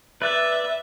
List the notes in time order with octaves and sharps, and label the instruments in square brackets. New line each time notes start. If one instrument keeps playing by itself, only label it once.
[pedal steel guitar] B4 D5 [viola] E5